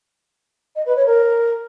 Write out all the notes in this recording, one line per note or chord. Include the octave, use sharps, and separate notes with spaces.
D#5
B4
C#5
A#4